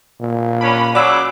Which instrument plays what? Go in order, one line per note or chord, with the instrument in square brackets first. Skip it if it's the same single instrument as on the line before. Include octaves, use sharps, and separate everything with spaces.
[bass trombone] A#2
[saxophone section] C#4 D4 [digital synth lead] B5
[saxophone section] C#3 F#3 [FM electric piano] D5 B5 E6 [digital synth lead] D6